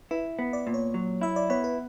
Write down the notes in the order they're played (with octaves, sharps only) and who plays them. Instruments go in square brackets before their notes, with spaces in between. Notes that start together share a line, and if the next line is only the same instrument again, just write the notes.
[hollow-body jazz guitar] E4 [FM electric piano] B4
[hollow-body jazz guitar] B3
[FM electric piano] D5
[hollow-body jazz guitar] A#2
[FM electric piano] C#5
[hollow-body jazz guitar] F#3
[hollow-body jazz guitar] E4 [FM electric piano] E5
[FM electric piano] D5
[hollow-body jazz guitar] B3 [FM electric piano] C#5
[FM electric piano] B4